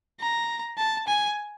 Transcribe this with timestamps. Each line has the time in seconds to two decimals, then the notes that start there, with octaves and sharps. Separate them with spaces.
0.20 A#5
0.78 A5
1.07 G#5